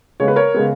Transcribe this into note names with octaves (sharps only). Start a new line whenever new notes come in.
C#3 G#3 B3 C#5
B4
A#4 C#5
C#3 G#3 B3